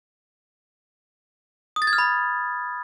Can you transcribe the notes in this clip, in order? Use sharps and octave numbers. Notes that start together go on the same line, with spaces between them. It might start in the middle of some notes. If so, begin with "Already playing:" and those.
D#6
A6
G#6
F6
B5